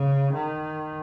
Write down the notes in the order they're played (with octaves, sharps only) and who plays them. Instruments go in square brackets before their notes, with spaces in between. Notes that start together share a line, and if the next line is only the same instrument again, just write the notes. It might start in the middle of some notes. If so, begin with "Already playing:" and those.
Already playing: [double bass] C#3
D#3